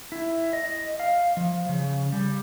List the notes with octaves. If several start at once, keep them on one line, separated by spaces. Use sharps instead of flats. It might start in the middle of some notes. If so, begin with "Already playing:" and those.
E4
D#5
F5
F3
C#3
G3